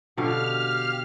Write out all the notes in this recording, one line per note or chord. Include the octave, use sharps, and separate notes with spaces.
B2 D3 G4 F5 F6